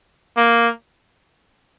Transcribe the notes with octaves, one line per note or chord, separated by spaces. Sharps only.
A#3